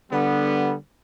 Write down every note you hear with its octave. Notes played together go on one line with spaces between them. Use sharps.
D3 G3 B3